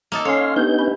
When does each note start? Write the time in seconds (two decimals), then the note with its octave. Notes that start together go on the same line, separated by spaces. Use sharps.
0.12 A#3 D#4 A4
0.25 C#4 A4 C#5 F5 C6
0.56 B3 D4 D#4 G4 G6
0.79 C#4 B5